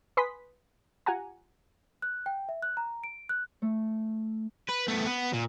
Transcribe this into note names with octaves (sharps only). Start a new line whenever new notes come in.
B4 G#5 B5 C6 D#6 B6
F4 G4 F#5 G#5 A#5
F#6
G5
E5
F#6
A#5
D7
F#6
A3
B4
A3 B3
B3
A#2